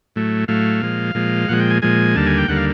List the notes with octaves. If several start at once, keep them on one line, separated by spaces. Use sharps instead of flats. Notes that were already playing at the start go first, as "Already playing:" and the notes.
A2 F#3 A3
A2 F#3 A3 F5
A#2 F3 G#3
A#2 F3 G#3
A#2 F3 G#3 F#5
G5
G#5
A#2 F3 G#3 G#5
D#2 D3 G3 A#3 A5
G#5
G5
D#2 D3 G3 A#3 F#5
F5